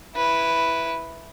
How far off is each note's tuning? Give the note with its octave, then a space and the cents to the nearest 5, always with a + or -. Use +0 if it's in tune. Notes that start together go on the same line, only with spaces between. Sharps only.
E4 +0 B4 +0